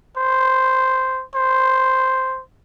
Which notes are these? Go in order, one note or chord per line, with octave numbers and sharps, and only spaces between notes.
C5
C5